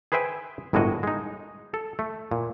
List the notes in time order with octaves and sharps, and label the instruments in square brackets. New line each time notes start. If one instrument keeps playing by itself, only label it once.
[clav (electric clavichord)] G#4 B4 C5 E5 G5 G#5
G1 A2 G#3 A#3 F#4 D#5
G#3 D#4
A4
A3
A#2